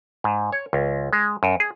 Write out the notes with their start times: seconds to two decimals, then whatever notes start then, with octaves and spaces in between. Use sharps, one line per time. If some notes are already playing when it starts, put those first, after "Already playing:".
0.24 G#2
0.52 C#5
0.73 C#2
1.13 G#3
1.43 F#2
1.60 G#4